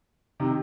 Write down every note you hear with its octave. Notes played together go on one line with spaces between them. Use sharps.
C3 D#3